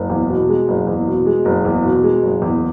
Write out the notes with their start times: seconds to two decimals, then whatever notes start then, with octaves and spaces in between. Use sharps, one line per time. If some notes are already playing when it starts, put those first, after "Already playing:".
Already playing: F#1
0.10 E2
0.29 B2
0.49 G#3
0.68 F#1
0.87 E2
1.06 B2
1.26 G#3
1.45 F#1
1.65 E2
1.84 B2
2.03 G#3
2.23 F#1
2.42 E2